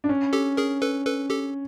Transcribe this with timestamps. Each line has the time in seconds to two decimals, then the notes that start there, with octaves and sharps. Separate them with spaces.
0.04 D4
0.09 C#4
0.33 G4 A4
0.57 G#4 A#4
0.82 A4 B4
1.05 A4 B4
1.30 G4 A4